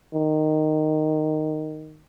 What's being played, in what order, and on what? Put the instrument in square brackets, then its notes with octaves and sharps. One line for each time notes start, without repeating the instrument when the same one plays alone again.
[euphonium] D#3